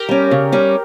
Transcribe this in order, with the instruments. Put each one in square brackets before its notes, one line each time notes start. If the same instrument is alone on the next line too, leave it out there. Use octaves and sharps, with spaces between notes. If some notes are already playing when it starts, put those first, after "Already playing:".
Already playing: [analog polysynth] G4 A#4
[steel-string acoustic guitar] G3 C#4
C#3
G3 C#4